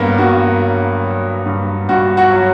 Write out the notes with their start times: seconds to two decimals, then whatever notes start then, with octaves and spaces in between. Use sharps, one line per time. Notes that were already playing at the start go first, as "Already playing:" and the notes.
Already playing: G2 F#3 A#3 B3
0.18 G2 F#4
0.61 F#3
1.03 F#3
1.46 G2
1.89 G2 F#4
2.17 F#4
2.30 F#3